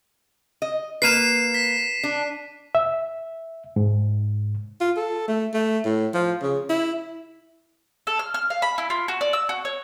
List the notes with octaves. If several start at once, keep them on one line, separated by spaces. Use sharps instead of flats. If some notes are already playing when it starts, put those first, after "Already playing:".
D#5
A#3 B4 C7 D#7 E7
B6
D4
E5
G#2
F4
A4
A3
A3
A2
F3
C#3
E4
A4
F6
F6
F5
B5
E4
F4
F#4
D5
E6
F#4
C#5